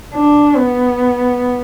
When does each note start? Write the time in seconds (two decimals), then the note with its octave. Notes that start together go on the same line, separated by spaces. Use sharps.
0.14 D4
0.56 B3